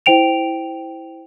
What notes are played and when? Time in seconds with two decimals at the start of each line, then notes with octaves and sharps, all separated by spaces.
0.06 E4 C5 G5 D7 F7